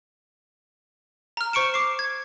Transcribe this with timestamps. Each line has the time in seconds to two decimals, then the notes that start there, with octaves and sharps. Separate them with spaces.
1.37 A#5 F6
1.53 C5 C#6 C#7 D7 E7
1.74 D6 C7
1.99 G#6